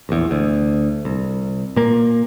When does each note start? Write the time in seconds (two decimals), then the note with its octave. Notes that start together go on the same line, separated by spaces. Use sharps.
0.09 A#1 E2
0.31 D2
1.05 C2
1.76 A#2 A#3